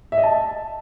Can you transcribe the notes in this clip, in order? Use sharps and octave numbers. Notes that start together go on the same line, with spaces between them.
E5
D#5
A5